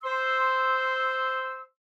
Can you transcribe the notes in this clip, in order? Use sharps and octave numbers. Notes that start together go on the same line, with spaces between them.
C5 C6 E6